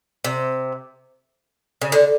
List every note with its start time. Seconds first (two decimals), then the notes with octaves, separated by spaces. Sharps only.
0.25 C3
1.82 C#3
1.92 D3